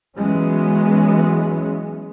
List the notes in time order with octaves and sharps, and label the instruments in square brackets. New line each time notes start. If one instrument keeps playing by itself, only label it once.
[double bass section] E3 F#3 G#3 B3 C#4